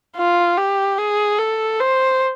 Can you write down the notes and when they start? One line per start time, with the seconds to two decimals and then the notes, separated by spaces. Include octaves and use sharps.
0.17 F4
0.57 G4
0.98 G#4
1.39 A4
1.80 C5